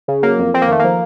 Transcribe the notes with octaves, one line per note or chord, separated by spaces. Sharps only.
C#3
F#3 A#3
F2
F2 C4
A#3
D#3 A3
F3 A#3